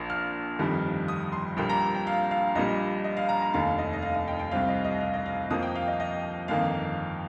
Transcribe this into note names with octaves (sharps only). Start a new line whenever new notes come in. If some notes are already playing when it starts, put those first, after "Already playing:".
Already playing: A#1 A#2 A#3
F6
G1 F2 D#3 G3
D#6
C6
A#1 A#2 G3 A#3 G5
A#5
G5
F5
F5
A#1 A#2 G3 D#5
D#5
F5
A#5
A#5
F1 D#2 D#3 F5
D#5
D#5
F5
D#5
G5
G5
C2 C3 G3 C4 F5
D#5
D#5
F5
D#5
F5
F2 F3 A#3 D#6
G5
F5
D#5
D#5
G1 F2 D#3 A#3 F5